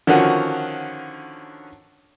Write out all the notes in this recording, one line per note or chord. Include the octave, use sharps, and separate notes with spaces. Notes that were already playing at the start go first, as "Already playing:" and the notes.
D3 D#3 F3 C#4 F#4 F#5